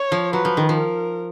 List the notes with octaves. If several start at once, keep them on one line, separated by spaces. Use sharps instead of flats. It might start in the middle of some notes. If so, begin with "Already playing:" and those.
Already playing: C#5
F3
F#3 B4
F3
D#3
F3
A#4